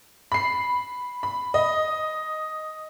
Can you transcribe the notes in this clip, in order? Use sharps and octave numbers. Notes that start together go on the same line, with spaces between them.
B5 C7
B5
D#5